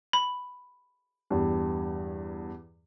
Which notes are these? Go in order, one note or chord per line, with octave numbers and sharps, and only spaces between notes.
B5
E2 G2